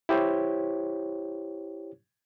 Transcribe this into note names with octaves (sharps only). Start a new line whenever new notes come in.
E4 G4 C5 C#5